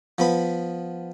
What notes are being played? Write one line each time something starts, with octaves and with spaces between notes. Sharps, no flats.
F3 B3 B5